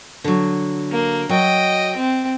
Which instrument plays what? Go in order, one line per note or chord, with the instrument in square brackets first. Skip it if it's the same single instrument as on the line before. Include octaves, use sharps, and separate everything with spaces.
[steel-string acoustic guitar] D3 F#3
[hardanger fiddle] A#3
[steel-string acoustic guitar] F#3 [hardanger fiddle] D#5 G5
[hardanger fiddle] C4